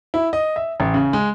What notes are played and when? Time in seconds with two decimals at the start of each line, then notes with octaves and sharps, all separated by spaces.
0.14 E4
0.33 D#5
0.56 E5
0.80 A1
0.94 C#3
1.13 G#3